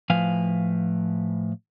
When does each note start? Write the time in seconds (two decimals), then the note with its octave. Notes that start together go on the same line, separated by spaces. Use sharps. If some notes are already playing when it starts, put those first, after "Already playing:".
0.10 A2 F3 B4 F5 G#5